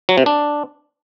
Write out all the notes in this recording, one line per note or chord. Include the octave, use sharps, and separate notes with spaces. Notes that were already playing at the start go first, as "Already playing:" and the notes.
F#3
C3
D4